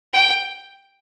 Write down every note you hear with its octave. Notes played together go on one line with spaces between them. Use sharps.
G5